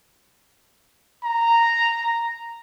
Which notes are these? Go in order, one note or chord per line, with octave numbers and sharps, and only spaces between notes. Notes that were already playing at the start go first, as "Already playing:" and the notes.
A#5